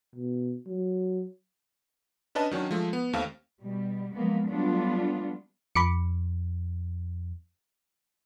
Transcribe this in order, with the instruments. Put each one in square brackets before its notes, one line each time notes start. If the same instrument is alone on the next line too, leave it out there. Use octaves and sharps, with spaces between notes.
[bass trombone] B2
F#3
[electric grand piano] C#4 D4 B4 D#5 A5
D#3 F#3 C#4 D4
F3 G#3 A3
B3
D#2 A3 C4 F5 F6
[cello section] B2 G3
F3 F#3 G#3 A#3 B3
F#3 G3 A3 B3 D4 F4
[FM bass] F2 [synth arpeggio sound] B5 D6 C#7